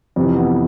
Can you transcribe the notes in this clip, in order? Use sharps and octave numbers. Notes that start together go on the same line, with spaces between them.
F2 C3 E3 C4
B3